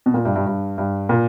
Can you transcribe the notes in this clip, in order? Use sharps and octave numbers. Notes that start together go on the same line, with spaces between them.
B2
A#2
G2
G2
G2
G2
A#2